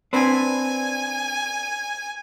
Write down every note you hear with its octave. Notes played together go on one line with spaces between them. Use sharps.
C4 D4 B4 G#5